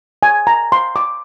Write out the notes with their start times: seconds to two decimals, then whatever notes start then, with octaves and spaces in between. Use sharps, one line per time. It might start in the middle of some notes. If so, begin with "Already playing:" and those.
0.23 G#5
0.47 A#5
0.72 C6
0.96 D6